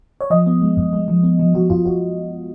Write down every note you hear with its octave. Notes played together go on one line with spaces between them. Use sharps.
C#5
F3 D#5
B3
G#3
F#2
G#3
F3
B3
F3
F3 F#4
F#2 F4
F#2 F#4